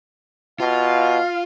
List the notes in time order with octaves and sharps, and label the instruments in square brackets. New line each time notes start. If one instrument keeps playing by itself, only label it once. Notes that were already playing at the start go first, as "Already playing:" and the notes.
[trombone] B2 [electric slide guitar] F4 [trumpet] F5